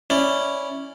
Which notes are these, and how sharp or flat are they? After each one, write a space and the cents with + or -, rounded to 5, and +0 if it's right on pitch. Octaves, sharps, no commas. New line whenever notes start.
C#4 +0 E4 -10 D5 +0